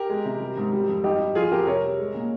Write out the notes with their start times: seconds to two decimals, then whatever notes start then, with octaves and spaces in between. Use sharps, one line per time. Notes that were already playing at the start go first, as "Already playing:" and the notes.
Already playing: G4 A#4
0.10 G#3
0.25 C3
0.41 G3
0.57 G#2
0.73 G3
0.88 F2
1.04 G2 D#4 G4
1.20 G3
1.35 F3 F4 G#4
1.51 F2 G4 A#4
1.67 C3 A#4 C#5
1.82 G3
1.98 G#3
2.15 A#2